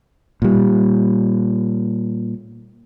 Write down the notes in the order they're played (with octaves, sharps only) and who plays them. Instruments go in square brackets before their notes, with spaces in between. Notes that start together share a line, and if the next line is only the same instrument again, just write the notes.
[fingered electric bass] A#2 G3